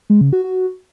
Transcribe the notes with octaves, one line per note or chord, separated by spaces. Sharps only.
G#3
C#3
F#4
F#4